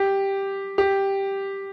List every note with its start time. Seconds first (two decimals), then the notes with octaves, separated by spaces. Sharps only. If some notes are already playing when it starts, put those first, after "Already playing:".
Already playing: G4
0.78 G4